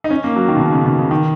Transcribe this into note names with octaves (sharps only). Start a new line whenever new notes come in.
D#4
C#4
A#3
F#3
D#3
B2
C#3
C#3
B2
C#3
D#3